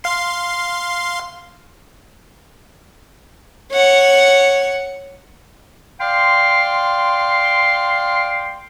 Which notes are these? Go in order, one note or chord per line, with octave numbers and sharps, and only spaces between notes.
F5 C6
C#5 F#5
D5 F5 G5 C6